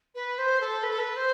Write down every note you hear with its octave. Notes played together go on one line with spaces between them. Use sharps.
B4
C5
A4
B4
A4
B4
C5